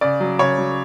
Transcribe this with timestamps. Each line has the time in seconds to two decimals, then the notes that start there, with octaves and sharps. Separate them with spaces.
0.01 C#3 D5
0.20 F#3
0.39 C#3 C#5
0.59 F#3